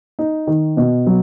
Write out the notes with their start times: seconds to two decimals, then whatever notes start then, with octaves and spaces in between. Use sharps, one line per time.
0.19 D#4
0.47 D#3
0.77 B2
1.07 F#3